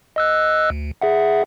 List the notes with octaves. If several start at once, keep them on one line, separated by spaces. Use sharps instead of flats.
D#5 E6 F#6
D2
G#4 E5 F#5